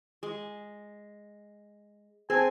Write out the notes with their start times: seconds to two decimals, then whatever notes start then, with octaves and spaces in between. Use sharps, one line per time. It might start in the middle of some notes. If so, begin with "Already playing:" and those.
0.23 G#3
2.30 C4 G#4 G#5 A5